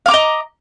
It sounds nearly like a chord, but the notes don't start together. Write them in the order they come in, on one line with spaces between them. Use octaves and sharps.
F5 D6 A#5 D#5